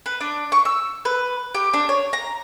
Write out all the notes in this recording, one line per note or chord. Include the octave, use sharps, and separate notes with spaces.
B4
D4
C#6
E6
B4
G4
D4
C#5
A#5